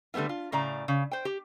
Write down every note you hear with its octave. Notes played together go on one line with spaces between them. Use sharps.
D3 G3 A3 B3 F4
F4
A2 C#3 D5 A#5
C#3
C5 G5
G4